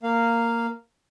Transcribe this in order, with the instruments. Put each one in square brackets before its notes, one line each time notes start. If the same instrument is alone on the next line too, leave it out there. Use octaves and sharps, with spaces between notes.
[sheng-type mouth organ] A#3 F5